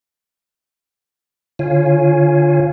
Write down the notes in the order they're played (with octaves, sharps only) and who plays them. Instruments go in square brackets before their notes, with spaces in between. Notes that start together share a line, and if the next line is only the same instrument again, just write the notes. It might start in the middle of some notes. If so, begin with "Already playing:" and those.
[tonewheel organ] D3 F4 C#5 F5 G#5